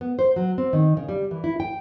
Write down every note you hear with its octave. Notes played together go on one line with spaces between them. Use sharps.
B3
C5
F#3
C4
D#3
C#3
G3
E3
E4
G5